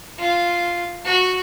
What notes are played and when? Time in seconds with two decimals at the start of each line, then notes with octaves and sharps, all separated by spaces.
0.19 F4
1.05 F#4